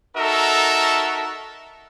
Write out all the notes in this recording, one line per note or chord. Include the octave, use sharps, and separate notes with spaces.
D#4 F#4 A4 A#4 E5